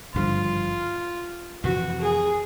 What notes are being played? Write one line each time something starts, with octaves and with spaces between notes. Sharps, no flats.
G#1 G2 D3 F3 F4
F2 C3 E3 F#4
G#4